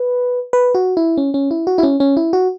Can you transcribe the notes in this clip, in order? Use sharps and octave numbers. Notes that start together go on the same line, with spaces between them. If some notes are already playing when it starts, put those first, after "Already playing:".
Already playing: B4
B4
F#4
E4
C#4
C#4
E4
F#4
E4
C#4
C#4
E4
F#4